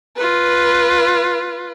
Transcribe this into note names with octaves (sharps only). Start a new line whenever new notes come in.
F4 B4